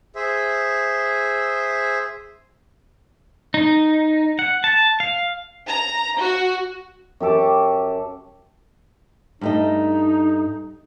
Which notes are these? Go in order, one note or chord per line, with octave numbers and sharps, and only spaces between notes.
G#4 C5 E5
D#4
F#5
A5
F5
A#5
F#4
F#2 G4 A4 D6
G2 A3 D#4 D#5